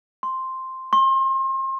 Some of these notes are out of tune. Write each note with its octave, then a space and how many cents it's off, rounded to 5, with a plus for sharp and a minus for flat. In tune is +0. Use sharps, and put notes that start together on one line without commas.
C6 +0
C6 +35